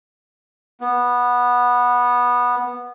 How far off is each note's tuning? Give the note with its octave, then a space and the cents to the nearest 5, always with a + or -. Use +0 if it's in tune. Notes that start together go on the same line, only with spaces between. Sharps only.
B3 -15